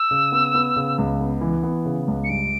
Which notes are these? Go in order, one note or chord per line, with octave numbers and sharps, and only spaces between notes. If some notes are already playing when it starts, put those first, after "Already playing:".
Already playing: E6
C#3
B3
B3
C#3
C#2
B3
E3
B3
C#3
C#2
C#7
G2 D7